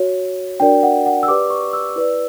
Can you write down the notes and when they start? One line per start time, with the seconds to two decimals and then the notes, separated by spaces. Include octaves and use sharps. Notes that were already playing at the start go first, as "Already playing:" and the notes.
Already playing: F#4 C#5
0.60 D4 F#4 A#4 D5 G5
0.83 F#5
1.06 F#5
1.23 E6
1.28 G4 B4 D5 D6
1.50 C#6
1.73 E6
1.96 E4 B4 D5